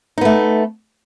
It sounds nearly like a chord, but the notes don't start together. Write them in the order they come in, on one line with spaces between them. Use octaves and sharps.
D#4 B3 A3